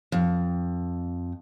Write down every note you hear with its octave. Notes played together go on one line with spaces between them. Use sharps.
F2